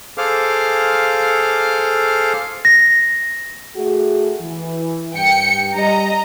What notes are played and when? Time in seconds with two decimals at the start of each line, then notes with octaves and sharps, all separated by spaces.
0.18 G#4 A4 C5 F5 D6 F6
2.65 A#6
3.76 A3 F#4 G#4
4.41 E3
5.14 G2 G5 C#7
5.75 G3 D#5 A#5